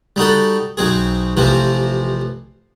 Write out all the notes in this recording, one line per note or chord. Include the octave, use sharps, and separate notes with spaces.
G3 D#4 F#4 A4
B1 F#3 C4 G#4
A1 C3 E3 F3 C4